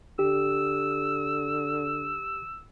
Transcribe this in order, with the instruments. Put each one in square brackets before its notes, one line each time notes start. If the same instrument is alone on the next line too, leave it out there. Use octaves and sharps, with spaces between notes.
[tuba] D3 [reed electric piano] G4 [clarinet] E6